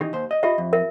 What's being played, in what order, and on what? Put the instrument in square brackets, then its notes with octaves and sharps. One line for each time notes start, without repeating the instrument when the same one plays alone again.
[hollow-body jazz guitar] D#3 E3 D#4 [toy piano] G4
[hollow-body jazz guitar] D#2 C5
D#5
[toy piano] F4 G4 E5 [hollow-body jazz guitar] D#5
[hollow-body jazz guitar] F2
[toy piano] A#4 E5